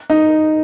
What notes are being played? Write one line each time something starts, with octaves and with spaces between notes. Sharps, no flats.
D#4